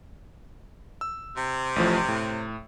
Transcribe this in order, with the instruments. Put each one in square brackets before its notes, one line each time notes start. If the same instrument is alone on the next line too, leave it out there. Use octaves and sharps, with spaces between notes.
[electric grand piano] E6
[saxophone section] C3
[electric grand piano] A1 A2 F3
A2